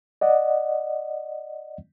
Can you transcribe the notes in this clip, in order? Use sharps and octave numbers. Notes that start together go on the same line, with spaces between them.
D5 D#5 F#5